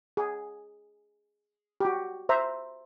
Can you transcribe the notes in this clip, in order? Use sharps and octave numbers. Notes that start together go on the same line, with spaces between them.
G#4
F#4 G4
C5 E5 A#5